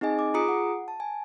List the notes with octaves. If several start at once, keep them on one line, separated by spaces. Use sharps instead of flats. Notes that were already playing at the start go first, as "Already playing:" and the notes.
C4 D#4 G#4 D#5 G#5
D6
F4 G#4 A#5 D#6 C#7 D7
F#5
A5
G#5